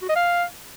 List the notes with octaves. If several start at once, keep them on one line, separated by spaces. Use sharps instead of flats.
F#4
D#5
F5